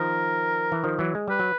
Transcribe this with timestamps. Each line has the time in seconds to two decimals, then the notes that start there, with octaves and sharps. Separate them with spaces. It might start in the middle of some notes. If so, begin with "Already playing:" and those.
Already playing: D#3 F3 A#4
0.72 E3
0.84 D#3 F3
0.99 E3 F#3
1.15 G#3
1.28 G3 B4
1.39 F#3